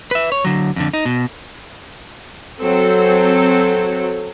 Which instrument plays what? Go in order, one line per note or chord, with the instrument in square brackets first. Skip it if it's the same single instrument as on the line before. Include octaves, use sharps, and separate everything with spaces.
[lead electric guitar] B4 E5
C#5
D3 F#3
F2 D3
D#4
B2
[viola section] F#3 C4 A4